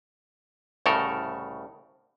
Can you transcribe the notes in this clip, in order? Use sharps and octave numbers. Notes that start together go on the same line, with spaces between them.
C2 A2 C#3 A4 A#4